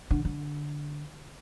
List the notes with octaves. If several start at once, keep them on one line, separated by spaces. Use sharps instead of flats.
D3
D3